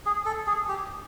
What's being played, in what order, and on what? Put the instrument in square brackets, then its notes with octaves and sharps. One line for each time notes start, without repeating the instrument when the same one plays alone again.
[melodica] G#4
A4
G#4
G4